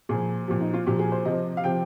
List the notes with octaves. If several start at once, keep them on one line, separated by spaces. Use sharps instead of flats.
A#2 F3 G#4
A#2 F3 G4
D#4
F4
A#2 F3 G4
G#4
C5
C3 F3 D#5
F5
C3 F3 G5